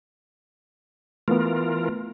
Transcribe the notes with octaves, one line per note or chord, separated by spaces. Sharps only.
E3 A3 B3 F4 A#4